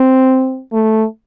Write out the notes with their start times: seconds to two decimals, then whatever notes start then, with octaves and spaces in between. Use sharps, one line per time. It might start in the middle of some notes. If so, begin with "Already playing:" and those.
Already playing: C4
0.72 A3